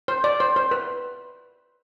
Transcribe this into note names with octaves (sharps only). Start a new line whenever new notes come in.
C5
D5
C5
C5
B4